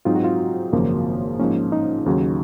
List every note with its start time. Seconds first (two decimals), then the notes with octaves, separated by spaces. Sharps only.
0.05 G#2 F#3 C4 D#4 F4
0.16 F#4
0.24 F4
0.73 G#1 F#2 C#3 F3 A#3
1.40 G#2 F3 A#3 C#4
1.72 D#4
2.06 D#2 C#3 F#3